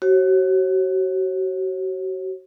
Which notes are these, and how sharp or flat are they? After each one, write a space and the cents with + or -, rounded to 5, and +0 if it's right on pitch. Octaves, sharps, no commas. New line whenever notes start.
F#4 +35 C#5 -40